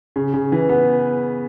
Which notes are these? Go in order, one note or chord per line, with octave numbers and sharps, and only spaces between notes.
C#3
C#3
E3
B3